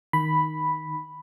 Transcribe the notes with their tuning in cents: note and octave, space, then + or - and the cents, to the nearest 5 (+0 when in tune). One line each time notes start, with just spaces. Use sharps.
D#3 +0 B5 +0